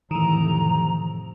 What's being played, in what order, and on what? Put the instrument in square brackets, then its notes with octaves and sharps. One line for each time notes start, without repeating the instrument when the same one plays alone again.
[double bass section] F2 A2 C3 [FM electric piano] D#3 E3 [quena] A#5